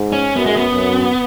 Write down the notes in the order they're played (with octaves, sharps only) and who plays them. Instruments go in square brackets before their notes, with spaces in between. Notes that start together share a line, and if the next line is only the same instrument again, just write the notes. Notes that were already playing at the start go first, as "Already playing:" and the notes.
Already playing: [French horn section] G#2
[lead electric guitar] C#4
[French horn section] F#2 [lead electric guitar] B3
[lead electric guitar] G#3
B3
[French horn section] F#2